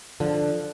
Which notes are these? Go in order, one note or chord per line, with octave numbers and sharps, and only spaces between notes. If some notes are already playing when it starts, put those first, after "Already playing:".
D3 F3